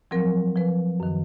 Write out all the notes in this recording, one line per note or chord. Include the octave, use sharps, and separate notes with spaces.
F3 F#3 C4 A#4
F3 B4
F#2 D#3